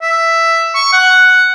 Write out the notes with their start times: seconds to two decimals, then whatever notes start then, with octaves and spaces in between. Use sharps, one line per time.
0.02 E5
0.74 C#6
0.92 F#5